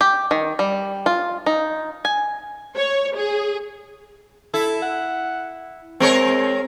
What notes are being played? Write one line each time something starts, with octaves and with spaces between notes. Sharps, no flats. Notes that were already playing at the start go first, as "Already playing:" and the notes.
G4
D#3
G3
F4
D#4
G#5
C#5
G#4
E4 A4
F#5
G#3 C4 A#4 C#5